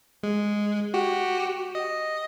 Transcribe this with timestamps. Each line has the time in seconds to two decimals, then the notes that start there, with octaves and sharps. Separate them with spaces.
0.23 G#3
0.94 F#4 G4
1.75 D#5